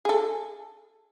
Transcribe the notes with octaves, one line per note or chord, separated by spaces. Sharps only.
G#4 A4